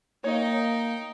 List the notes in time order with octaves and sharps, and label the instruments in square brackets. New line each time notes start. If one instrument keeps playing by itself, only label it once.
[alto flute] A#3 [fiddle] D#4 G5 [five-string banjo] C#5 D#5